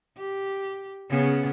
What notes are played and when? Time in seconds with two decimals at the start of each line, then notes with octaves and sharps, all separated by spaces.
0.18 G4
1.09 C#3 B3 C#4